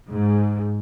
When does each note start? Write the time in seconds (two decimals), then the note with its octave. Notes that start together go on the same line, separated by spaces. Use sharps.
0.11 G#2